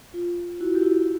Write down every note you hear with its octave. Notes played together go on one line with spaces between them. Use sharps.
F4
E4 F#4
G4
E4 F#4